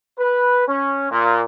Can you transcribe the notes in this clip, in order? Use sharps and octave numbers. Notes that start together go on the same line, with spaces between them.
B4
C#4
A#2